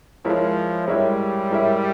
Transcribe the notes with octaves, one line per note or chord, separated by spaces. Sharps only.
F3 G#3 E4 A#4 C#5 E5
G3 G#3 E4 A#4 C#5 E5
G#3 E4 A#4 C#5 E5